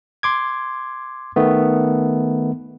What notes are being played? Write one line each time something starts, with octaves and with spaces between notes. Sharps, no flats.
C6 D6 G#6
D#3 A3 B3